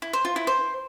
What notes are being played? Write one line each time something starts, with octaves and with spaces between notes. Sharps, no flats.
E4
C5
F4
E4
C5